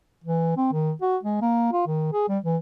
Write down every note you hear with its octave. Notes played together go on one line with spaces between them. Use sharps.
E3
C4
D#3
F#4
G#3
A#3
F4
D#3
G#4
G3
E3